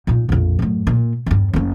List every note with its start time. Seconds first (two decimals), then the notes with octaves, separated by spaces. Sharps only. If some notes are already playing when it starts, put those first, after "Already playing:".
0.07 A#2 D#4
0.29 A#1 F2
0.59 F#2 A2
0.87 A#2
1.26 E2 G2
1.53 F#1 C#4